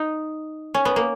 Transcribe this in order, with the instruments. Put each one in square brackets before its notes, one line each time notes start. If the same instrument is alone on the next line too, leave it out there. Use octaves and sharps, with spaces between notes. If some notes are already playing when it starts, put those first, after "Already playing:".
Already playing: [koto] D#4
C#4
B3
A#3